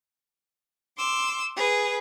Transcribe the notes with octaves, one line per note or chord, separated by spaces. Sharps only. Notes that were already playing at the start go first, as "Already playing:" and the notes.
C6 D6 E6
G#4 B4